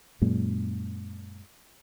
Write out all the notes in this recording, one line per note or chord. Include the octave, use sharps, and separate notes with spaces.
F#2 A#2 G#3